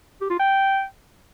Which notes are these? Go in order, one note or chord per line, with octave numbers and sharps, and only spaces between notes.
G4
F4
G5